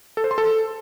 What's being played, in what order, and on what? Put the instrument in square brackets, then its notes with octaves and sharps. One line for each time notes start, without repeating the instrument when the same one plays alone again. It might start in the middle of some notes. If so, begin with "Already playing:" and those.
[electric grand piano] A4
C5
C6
A4